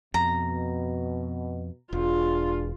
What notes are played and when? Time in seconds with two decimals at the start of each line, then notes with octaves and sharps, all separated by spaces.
0.14 F2 B2 A#5
1.93 E1 D4 F4 G#4